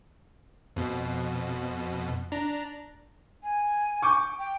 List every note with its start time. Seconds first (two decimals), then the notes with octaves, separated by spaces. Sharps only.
0.76 F2 B2
2.32 D4 A#5
3.42 G#5
4.02 C#6 D6 G6
4.39 G5